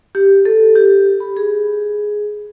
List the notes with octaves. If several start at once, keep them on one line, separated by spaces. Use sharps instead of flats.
G4
A4
G4
B5
G#4